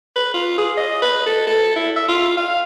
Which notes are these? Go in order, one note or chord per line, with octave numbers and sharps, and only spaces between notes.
B4
F4
G#4
D#5
B4
A4
A4
E4
E5
F4
F5